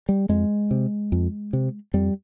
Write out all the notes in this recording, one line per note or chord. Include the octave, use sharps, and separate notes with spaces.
G3
F2 G#3
C3
F2
C3
F2 G3